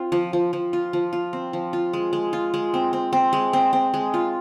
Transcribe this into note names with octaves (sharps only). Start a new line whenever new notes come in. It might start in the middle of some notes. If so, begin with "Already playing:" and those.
Already playing: C4 F4
F3
F3
F3
F4
F3
F4
C4
F3
F4
G#3
G#3
F4
G#3
C4
C4
C4
G#3
C4
C4
G#3
F4